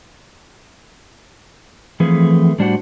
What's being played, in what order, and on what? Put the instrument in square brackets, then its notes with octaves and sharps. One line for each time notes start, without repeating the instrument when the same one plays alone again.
[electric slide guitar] E3 F3 A3 C4 G#4 B4
A2 G3 D4 F#4 C5 F#5